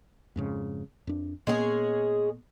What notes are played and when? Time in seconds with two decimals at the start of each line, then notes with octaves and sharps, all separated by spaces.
0.36 F2 G#2 C#3
1.07 F2 D4
1.47 A#2 G#3 A#3 B3 C#4 G#4